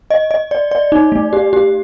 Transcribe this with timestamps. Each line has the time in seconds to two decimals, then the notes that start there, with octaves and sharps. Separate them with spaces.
0.11 D#5
0.31 D#5
0.51 D5
0.71 D5
0.92 D#4
1.12 A3
1.33 G4
1.53 G4